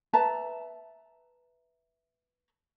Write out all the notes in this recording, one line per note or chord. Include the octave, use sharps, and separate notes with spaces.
B4 E5 A5 A#5